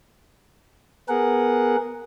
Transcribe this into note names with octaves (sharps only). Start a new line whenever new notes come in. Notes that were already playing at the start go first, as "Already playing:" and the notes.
B3 G#4 A#4 F#5